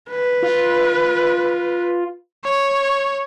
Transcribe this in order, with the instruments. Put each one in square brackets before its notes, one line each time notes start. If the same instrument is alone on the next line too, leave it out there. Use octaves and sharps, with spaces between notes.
[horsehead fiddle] B4
[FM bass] F4
[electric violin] C#5